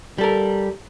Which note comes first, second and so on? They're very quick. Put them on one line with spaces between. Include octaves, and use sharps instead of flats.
G3 A4 A#4